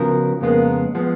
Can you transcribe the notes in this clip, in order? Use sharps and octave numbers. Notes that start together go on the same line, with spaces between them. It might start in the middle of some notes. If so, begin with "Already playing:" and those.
Already playing: C#3 F3 B3 F#4 A#4
F2 C#3 G#3 A#3 B3
F3 G#3 B3